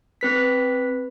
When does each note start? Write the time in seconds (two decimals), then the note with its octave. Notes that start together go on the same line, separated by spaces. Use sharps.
0.21 C4 B4 B6